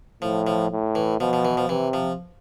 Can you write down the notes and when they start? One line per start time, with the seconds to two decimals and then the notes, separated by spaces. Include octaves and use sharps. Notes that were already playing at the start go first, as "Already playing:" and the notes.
0.22 A2 F3
0.47 F3
0.71 A2
0.95 E3
1.20 B2 F3
1.33 F3
1.45 E3
1.57 F3
1.69 C3 E3
1.93 F3